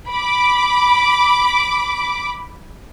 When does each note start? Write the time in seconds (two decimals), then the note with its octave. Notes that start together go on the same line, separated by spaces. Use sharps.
0.10 B5 D6